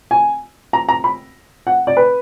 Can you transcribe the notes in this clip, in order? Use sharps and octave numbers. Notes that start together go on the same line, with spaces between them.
G#5
A#5
A#5
B5
F#5
D5
B4